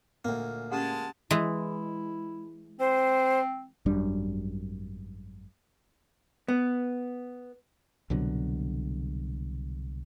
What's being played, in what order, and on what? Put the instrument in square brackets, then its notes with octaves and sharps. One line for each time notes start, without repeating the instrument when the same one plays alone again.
[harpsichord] D2 A#3 [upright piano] A#2
[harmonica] G#3 A5 [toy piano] C#4 G4 F#5
[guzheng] E3 G#3 [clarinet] E4
[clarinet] C4 [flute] C5
[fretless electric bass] G#1 F#2 G3 D4
[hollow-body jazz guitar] B3
[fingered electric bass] C2 B2 D3 F#3